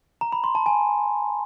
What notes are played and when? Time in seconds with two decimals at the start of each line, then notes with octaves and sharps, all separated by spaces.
0.21 A#5
0.32 B5
0.44 C6
0.55 A5
0.66 G#5